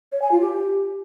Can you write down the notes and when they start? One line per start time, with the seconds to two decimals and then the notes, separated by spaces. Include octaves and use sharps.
0.12 C#5
0.22 G#5
0.32 F4
0.41 G4